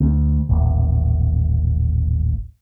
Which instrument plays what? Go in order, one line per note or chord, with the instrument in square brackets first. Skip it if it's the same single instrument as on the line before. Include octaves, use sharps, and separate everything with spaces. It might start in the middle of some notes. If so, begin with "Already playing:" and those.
[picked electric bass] D2
D#1 A1